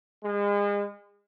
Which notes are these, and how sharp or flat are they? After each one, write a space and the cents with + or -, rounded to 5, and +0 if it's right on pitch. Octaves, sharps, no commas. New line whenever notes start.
G#3 -35